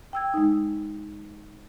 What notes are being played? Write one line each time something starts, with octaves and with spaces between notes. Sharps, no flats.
G5 E6 G#6
G#3 D#4